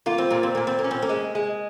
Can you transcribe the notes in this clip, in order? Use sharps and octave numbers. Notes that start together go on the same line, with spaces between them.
A#3 F4
C4
A#2 A#3
C4
A#2 A#3
C4
A#3
C#4
C4
A#3
G#3
G#3